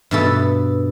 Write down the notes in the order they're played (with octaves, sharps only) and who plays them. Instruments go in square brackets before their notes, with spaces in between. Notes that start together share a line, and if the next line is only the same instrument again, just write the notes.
[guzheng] G2 B2 A4